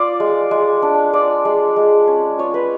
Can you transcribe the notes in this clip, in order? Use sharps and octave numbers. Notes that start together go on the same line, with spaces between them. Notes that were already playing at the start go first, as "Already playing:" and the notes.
Already playing: F4 D5
G#3
G#3
D4
F4 D5
G#3
G#3
C#4
F4 C#5
B4